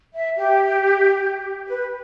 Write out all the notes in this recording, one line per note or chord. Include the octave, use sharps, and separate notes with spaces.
E5
G4
B4